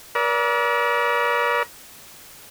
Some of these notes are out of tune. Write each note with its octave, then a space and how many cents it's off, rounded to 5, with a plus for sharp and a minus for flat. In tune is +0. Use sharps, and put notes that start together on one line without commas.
A#4 +45 D5 -25 E6 -30